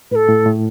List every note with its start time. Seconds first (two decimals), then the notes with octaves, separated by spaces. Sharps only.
0.11 A2 A4 B4
0.29 A2
0.46 A2